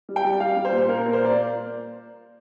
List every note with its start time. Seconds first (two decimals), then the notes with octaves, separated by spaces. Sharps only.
0.09 G3
0.16 G5
0.25 G3
0.40 G3 F5
0.57 G3
0.65 C5
0.72 A#2
0.89 A#3 A#4
1.01 A#4
1.05 A#2
1.13 C5
1.21 A#3 D5